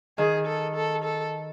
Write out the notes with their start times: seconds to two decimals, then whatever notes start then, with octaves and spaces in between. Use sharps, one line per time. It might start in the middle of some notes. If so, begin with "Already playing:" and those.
0.18 D#3 G#4
0.47 A4
0.76 A4
1.04 A4